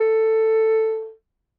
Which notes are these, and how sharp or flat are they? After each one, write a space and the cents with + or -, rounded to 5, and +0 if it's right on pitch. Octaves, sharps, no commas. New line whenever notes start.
A4 +10